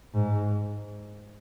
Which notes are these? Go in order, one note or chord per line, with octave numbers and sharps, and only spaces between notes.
G#2